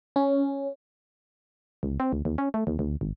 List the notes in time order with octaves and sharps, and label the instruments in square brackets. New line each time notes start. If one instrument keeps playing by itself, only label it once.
[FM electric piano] C#4
[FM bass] C#2
C4
D2
D#2
C#4
A3
D#2
D2
G#1